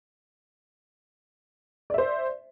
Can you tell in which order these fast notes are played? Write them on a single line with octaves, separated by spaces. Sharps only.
D5 E5 C5